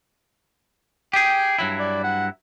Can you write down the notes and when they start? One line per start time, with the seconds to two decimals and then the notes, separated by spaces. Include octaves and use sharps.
1.13 G4 G#4 G5
1.58 G2 F#3 E4
1.80 D5
2.04 F#5